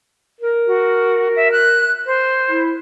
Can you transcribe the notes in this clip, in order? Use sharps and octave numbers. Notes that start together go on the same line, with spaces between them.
A#4
F#4
E5
F#6
C5
E4